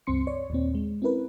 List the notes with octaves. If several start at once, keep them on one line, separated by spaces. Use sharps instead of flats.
C#2 G2 C4 C6 C#7
C#5 D5
D#2 A#2 C4
G#3
C4 C#4 E4 A#4 B4